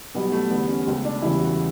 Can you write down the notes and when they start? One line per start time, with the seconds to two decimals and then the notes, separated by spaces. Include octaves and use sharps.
0.14 B1 B2 G3 B3
0.32 A3
0.50 E2 D3 G3 B3
0.68 C#4
0.87 C#2 B2 A3
1.05 D4
1.22 E1 E2 C#3 E3 G3 E4
1.41 F#4